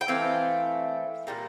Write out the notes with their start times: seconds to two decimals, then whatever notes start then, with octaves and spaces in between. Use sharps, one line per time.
0.01 G5
0.08 E3 A3 C4 F5
1.27 A#2 G3 A#3